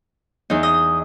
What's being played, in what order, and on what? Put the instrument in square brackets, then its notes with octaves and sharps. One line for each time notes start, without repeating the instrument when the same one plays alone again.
[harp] E2 D#4
[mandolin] D#5